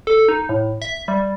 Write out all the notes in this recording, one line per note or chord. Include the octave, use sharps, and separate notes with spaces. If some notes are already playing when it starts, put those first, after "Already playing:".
A4
D#4
A2
E5
G3